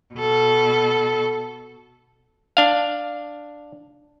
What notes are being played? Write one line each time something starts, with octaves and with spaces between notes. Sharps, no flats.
B2 A4
D4 F5